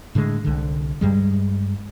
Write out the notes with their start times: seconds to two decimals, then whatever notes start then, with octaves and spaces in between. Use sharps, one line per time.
0.15 A2 D3 D#3 G#3
0.44 C2 D3
1.01 G2 G3 G#3